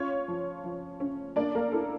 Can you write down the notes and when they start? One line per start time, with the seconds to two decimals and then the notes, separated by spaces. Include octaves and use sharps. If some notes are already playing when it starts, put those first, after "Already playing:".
Already playing: C#4 F4 C#5
0.28 F3
0.64 F3
1.00 C#4
1.36 A#3 D4 D5
1.55 A#3 A#4
1.72 E4 A4